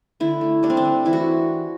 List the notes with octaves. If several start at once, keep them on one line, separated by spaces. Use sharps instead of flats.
D3 E4
A3
G3 D4
C4
D4
G3
E3 E4
F#4